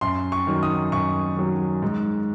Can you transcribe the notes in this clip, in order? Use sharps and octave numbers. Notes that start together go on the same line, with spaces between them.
F#2 C6
C#6
D#3 F#3
D#6
F#2 C#6
D#3 F#3
G#2